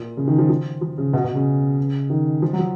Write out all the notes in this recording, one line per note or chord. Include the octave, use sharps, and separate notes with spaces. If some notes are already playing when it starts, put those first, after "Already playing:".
Already playing: A#2
C#3
D#3
F3
F3
F3
C#3
B2
B2
C#3
D#3
F3
F#3
F3